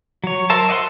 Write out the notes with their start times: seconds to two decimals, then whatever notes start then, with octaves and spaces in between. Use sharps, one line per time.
0.24 F#3 C#5
0.50 A#4 C5 E5 A5
0.69 D#5 E5 F#5 A5 C6